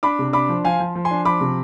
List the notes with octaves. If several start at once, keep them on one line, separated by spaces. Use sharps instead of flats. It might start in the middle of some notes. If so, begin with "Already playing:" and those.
D4 B5 D6
C3
D4 B5 D6
F3
F3 F5 G#5
F3
F3
G#5 C6
D4
F3 B5 D6
C3